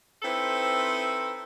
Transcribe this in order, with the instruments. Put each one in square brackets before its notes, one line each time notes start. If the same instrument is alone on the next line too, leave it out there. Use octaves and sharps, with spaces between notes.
[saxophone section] C4 D#4 E4 A4 B4 C5